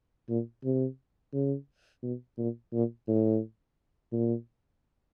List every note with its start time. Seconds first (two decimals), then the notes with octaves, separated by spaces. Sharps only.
0.29 A#2
0.64 C3
1.33 C#3
2.03 B2
2.38 A#2
2.73 A#2
3.08 A2
4.12 A#2